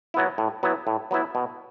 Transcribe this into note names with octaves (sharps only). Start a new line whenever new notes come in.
F#3 B3 E4
A2
F#3 B3 E4
A2
F#3 B3 E4
B2